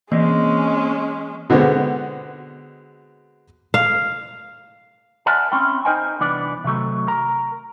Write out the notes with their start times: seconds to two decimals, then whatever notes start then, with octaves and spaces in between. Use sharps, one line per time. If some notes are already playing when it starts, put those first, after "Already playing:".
0.12 E3 G#3 A#3 C4 C#4 D#5
1.50 B2 D3 G#3 B3 C4
3.74 F5
5.26 A#4 D5 E5 F#5 G#5 A5
5.52 C4 C#4 E4 G5
5.85 D#4 A#4 C5 D#5 G5 G#5
6.20 C2 E3 B3 D4 D5
6.64 C3 D#3 F#3 A3
7.08 A#4 A#5